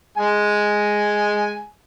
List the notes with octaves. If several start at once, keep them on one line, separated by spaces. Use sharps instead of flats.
G#3 G#5